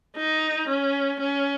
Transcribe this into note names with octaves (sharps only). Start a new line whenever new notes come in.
D#4
C#4
C#4